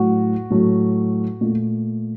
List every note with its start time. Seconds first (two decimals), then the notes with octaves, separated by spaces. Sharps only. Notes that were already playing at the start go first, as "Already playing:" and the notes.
Already playing: A2 F#3 A3 F#4
0.50 A2 F#3 A3
1.41 A#2 A3